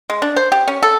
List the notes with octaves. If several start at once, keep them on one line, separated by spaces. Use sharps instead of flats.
G#3
D4
C5
G4
C#4
A4